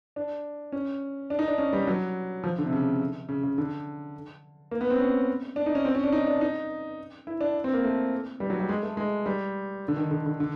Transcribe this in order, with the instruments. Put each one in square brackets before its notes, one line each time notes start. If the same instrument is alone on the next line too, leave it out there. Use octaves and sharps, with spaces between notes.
[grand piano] D4
C#4
D4
D#4
D4
C#4
G3
F#3
F3
D3
C3
C#3
C#3
C#3
D3
A#3
B3
C4
C#4
D4
D#4
C#4
C4
C#4
D4
D#4
D4
D#4
E4
D4
C4
A#3
A3
G3
F#3
G3
G#3
A3
G#3
G3
D3
D#3
D3
D3
D3